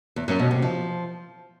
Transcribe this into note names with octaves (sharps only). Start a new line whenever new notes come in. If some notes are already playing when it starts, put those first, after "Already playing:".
E2
F#2
B2
C3
F3